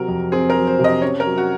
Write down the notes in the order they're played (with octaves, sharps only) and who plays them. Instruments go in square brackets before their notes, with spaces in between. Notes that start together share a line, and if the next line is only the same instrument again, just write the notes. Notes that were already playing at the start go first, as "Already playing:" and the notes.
Already playing: [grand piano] C3 F#3 [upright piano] A#4
[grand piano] F2
[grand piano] C4 [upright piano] G#4
[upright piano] A#4
[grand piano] F#3
[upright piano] C5
[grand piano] C3
[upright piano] D#5
[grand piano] C#4 [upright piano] C#5
[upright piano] A#4
[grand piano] F#3
[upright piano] F#4